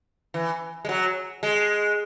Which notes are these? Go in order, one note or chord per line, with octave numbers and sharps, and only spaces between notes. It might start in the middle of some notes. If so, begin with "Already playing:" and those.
E3
G#3
F#3
G#3